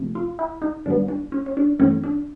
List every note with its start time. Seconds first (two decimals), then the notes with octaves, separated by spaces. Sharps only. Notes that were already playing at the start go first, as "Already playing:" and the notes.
Already playing: C3 F3 A3 C4
0.15 F4
0.39 E4
0.62 D#4
0.86 G#2 D#3 G3 B3 D4
1.09 D4
1.32 C#4
1.46 C#4
1.57 D4
1.79 G2 E3 A3 C4 C#4
2.04 D4